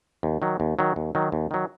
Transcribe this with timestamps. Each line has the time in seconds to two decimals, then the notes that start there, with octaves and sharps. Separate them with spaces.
0.23 D#2
0.42 D#3 F#3
0.60 D#2
0.79 D#3 F#3
0.96 D#2
1.15 D#3 F#3
1.32 D#2
1.51 D#3 F#3